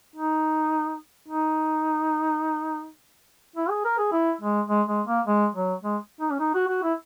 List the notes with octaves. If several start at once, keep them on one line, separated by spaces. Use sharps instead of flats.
D#4
D#4
E4
G#4
A#4
G#4
E4
G#3
G#3
G#3
A#3
G#3
F#3
G#3
D#4
C#4
D#4
F#4
F#4
E4